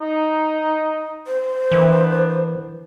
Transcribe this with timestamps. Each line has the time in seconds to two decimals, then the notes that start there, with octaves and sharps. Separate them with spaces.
0.01 D#4
1.27 C5
1.72 E3 A#3 B3 D4